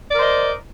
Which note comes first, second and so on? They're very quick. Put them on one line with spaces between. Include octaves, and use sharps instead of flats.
D5 A#4 C5 D#5